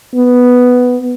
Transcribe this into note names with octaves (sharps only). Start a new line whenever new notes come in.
B3